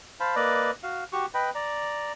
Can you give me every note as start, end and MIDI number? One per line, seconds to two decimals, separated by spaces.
0.20 0.35 72
0.20 0.35 77
0.20 0.35 81
0.20 0.35 83
0.36 0.71 58
0.36 0.71 71
0.36 0.71 74
0.36 0.71 75
0.84 1.04 66
0.84 1.04 77
1.13 1.26 66
1.13 1.26 67
1.13 1.26 85
1.34 1.50 71
1.34 1.50 75
1.34 1.50 79
1.34 1.50 83
1.55 2.13 74
1.55 2.13 82